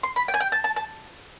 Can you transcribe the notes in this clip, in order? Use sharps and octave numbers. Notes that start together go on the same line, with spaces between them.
C6
B5
G5
G#5
G5
A5
A5
A5